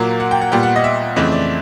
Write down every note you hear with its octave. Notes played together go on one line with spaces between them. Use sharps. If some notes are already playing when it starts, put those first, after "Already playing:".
Already playing: A#2 F#3 A#3
F#5
G5
F#5
A#2 G3 B3 G5
F#5
D#5
E5
F2 C#3 E3 A3 C4 D#5
D5